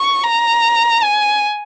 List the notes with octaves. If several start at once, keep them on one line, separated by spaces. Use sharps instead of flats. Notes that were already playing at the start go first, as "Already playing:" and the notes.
Already playing: C#6
A#5
G#5